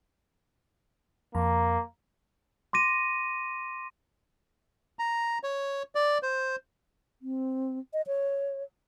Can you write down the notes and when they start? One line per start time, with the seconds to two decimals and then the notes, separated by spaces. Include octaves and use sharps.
1.35 F2 A#3 A#5
2.73 C6 D6 A#6 D#7
4.99 A#5
5.44 C#5
5.95 D5
6.23 C5
7.22 C4
7.93 D#5
8.07 C#5